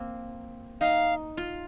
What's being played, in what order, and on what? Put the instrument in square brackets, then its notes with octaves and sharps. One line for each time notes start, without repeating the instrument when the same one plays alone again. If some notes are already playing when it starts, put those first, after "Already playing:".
Already playing: [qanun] A#3 C4
[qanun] D#4 [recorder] F5
[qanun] F4